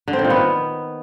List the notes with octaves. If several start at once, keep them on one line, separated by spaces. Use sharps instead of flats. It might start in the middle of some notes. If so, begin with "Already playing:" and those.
D3
C4
D#3
A#2
B3